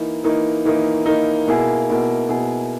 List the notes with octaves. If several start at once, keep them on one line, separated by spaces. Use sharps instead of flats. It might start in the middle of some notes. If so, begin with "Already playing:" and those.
Already playing: E3 A#3 D#4
E3 A#3 D#4
E3 A#3 D#4
E3 A#3 D#4
B2 A#3 E4 G#4
B2 A#3 E4 G#4
B2 A#3 E4 G#4